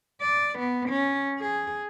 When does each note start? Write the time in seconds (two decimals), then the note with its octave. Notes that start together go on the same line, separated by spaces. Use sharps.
0.21 D5
0.59 B3
0.90 C#4
1.40 G#4